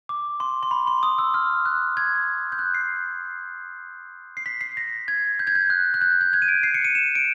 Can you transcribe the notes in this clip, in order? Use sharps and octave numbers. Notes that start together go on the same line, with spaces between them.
D6
C6
C6
B5
C6
D#6
E6
F6
F#6
G#6
G6
F#6
C7
C7
B6
C7
A#6
G#6
G6
G#6
G6
F#6
F#6
G6
G6
G#6
D#7
D7
C7
C#7
D#7
E7
D7